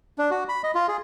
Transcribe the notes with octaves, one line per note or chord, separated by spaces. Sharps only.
D4
F#4
B5
D#5
F4
G#4